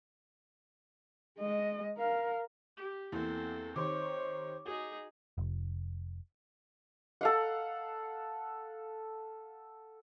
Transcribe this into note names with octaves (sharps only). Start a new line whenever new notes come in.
G#3 D#5
A#4 F5
G4
E2 A#3 C4 E4 A4
D#3 G4 C5 C#5 C6 D6
D#4 F#4 G#4
F1
A4 F5 F#5